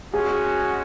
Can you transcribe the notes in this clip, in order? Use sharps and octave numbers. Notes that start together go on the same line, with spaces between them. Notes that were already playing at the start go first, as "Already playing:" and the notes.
G#3 C#4 F#4 G#4